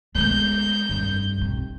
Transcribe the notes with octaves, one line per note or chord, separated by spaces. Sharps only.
G#3 A3 B3 G6
F1 G2
F1 C3